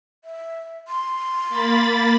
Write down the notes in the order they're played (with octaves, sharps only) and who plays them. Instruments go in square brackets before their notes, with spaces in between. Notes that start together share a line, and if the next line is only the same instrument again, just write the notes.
[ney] E5
C6
[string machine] A#3 B5 A6